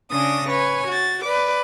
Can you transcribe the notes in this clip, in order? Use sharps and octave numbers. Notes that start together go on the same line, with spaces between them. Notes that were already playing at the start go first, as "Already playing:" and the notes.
C#3 C#4 D4 D#6 A#6
B4 C#5 G#5
F#4 A6
B4 D5 D6